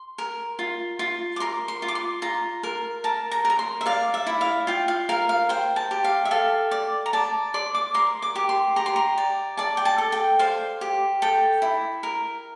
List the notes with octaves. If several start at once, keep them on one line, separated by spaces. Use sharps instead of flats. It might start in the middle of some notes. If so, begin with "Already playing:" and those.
Already playing: C6
A#4
F4
F4
D6
A#4 C6
C6
F4
D6
C6
F4 A#5
A#4
A#4 A5
A#5
A#4
A#5
C6
E5
D5 F5
E5
E4
F5
F4 G5
F5
A#4 F5
F5
C5 G5
A5
G4
F5
E5
A4 F5
D5
A#5
D5 A5
D5 C6
D6
A#4 C6
D6
G4
C6
G4 A#5
C6
A#5
D5
D5 A5
G5
A5
A4
G5
C5 F5
G4
A4 G5
E4
A#4